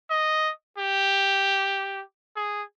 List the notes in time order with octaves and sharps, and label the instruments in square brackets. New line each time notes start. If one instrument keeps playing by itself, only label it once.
[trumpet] D#5
G4
G#4